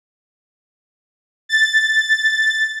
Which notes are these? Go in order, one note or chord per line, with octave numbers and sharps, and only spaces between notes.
A6